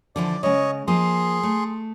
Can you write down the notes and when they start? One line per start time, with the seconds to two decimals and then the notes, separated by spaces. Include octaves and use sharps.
0.16 D3 E3 F3 D5
0.43 C#3 G#3 C#5 D#5
0.87 F3 A#3 G#4 D#5 C6
1.43 A3